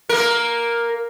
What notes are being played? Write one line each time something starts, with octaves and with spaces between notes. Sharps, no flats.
A#3 A#4